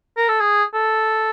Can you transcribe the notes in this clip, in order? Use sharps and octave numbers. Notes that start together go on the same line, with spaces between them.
A#4
A4
G#4
A4